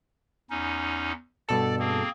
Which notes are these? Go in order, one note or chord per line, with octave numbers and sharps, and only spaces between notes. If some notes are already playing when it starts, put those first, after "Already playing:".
E2 C#4 D#4
G2 B2 A4 D5
A#3 C4 G#4